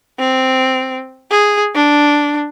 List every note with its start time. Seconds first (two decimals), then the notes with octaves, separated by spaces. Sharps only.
0.19 C4
1.30 G#4
1.75 D4